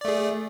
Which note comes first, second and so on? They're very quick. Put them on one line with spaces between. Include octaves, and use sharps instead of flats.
D5 A3 G#4